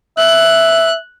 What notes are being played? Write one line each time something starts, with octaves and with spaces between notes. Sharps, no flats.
E5 F#6